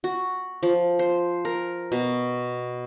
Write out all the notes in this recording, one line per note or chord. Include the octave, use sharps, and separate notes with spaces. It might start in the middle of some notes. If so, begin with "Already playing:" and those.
F#4
F3
C5
A#4
B2